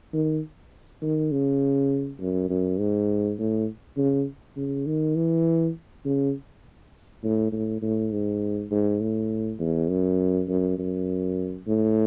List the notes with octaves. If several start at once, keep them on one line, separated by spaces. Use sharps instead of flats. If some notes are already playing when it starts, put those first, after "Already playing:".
D#3
D#3
C#3
F#2
F#2
G#2
A2
C#3
C#3
D#3
E3
C#3
A2
A2
A2
G#2
G#2
A2
E2
F#2
F#2
F#2
A2